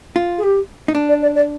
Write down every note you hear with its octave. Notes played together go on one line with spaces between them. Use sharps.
F4
G#4
G4
D#4
D4
D5
D5
D5